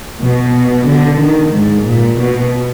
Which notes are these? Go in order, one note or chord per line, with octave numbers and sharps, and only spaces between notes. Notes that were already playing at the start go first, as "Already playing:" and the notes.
B2
D3
D#3
G#2
A#2
B2